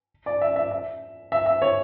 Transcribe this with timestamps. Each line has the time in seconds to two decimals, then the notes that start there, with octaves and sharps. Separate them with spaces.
0.26 D5
0.41 E5
0.56 E5
0.71 E5
1.32 E5
1.46 E5
1.62 C#5